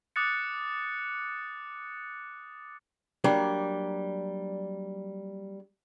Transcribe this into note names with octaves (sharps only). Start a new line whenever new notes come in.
D6 D#6 F#6 A6 C#7
F#3 G3 A#3 D4